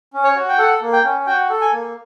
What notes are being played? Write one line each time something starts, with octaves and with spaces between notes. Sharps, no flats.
C#4
C#5
F#4
G5
A4 F#5
A#3
G5
C#4
F#4 G5
A4
G#5
A#3